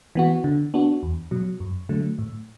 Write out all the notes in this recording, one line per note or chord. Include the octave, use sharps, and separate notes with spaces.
E3 B3 F#4
D3
B3 D4 F#4
E2
B2 F#3
F#2
D3 F#3 A3
A2